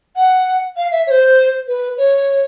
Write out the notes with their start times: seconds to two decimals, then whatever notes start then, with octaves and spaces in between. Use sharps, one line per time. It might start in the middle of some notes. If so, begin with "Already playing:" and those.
0.16 F#5
0.77 F5
0.92 E5
1.07 C#5
1.11 C5
1.68 B4
1.98 C#5